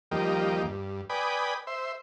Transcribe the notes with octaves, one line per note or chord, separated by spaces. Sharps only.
D#2 F3 G3 A#3 G4 D#5
G2
B4 D5 G5 G#5 B5 D#6
C5 E5